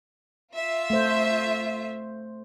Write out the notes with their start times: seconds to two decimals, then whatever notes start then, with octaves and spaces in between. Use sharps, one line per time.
0.54 F4 E5
0.90 A3 C5